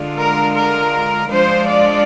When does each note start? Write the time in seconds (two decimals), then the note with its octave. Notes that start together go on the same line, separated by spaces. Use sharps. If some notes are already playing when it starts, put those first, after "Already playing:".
Already playing: D3 G#3 D4 F4
0.18 A#4
0.56 A#4
1.30 F3 G#3 D4 F4 C5
1.68 D5